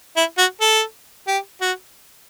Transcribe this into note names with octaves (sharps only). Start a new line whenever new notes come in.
E4
F#4
A4
G4
F#4